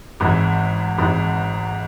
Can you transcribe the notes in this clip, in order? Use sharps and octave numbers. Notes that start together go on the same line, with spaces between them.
G#1 G#2 E3
G#1 G#2 E3